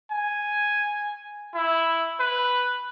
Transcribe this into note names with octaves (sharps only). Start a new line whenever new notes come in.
G#5
E4
B4